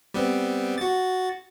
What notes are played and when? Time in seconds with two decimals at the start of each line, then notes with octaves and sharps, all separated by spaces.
0.14 G3 B3 C4
0.78 F#4 A6